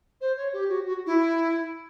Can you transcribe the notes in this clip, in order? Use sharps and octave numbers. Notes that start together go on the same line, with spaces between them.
C5
C#5
G4
F#4
F#4
E4